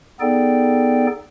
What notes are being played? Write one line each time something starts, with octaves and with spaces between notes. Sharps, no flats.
B3 D#4 G#4 A4 D5 G5